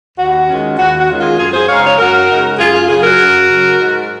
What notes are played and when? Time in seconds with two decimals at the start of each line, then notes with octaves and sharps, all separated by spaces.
0.19 D#2 F#4
0.49 D#3 G#3 C#4 F4
0.78 D#2 F#4
0.99 F#4
1.09 D#3 G#3 C#4 F4
1.19 F4 G#4
1.38 F#2 F4 G#4
1.53 G#4 C5
1.68 C#3 G#3 D#4 C#5 F5
1.84 C#5 F5
1.98 F#2 F#4 A#4
2.29 C#3 G#3 D#4
2.58 F#2 F4 G#4
2.73 F4 G#4
2.88 C#3 F#3 F4 G#4
3.03 F#4 A#4
3.19 F#2
3.49 C#3 F#3
3.79 G#2